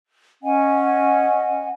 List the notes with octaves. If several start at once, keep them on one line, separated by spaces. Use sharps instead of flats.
C#4 D#5 F#5 G#5